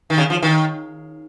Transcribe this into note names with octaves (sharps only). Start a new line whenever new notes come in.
D#3
C#3
F3
D#3